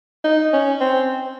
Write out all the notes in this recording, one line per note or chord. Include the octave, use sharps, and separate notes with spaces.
D#4
C#4
C4